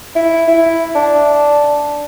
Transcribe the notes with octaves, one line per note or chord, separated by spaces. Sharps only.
E4
E4
D4